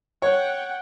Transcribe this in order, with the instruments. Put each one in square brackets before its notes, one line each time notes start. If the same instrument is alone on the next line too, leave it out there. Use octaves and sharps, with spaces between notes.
[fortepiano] C#5 [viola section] F#5 G5